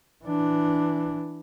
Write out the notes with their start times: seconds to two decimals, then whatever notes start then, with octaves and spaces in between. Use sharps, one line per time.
0.24 E3 D4